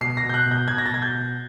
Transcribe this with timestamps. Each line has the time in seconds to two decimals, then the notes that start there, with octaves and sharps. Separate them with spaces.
0.01 B2 C7
0.17 A#6
0.23 B2
0.29 G6
0.34 F#6
0.46 B2
0.51 G6
0.68 B2 G#6
0.78 A#6
0.86 A6
0.91 B2 G#6
1.02 G6
1.13 B2